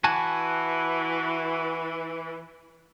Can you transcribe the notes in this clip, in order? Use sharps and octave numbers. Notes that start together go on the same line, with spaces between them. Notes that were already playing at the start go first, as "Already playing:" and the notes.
E3 F#4 G#5 A5